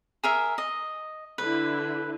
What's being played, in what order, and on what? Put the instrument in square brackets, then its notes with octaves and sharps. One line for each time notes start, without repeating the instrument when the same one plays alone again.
[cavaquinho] G#4 A#4 E5
D#5
[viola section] D3 E4 [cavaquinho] B4